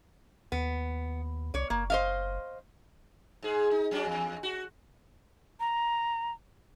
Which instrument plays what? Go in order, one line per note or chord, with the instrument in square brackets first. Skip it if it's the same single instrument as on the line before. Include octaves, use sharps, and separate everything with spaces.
[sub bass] D#2 [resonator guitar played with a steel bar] B3
[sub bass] C2 [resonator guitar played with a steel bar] C#5 D5
[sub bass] F#1 [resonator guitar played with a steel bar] A#3
[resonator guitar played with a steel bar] C5 D#5 F5
[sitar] G#2 G#4
D#4
F#3 C#4 D4
E2
F#4
[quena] A#5